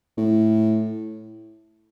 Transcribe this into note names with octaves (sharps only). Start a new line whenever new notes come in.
A2